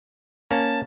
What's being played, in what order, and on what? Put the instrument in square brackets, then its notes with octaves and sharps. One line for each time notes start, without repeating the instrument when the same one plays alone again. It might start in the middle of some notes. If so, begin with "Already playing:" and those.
[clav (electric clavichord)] A#3 C#4 [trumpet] A5